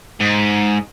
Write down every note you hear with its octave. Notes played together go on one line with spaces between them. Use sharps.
G#2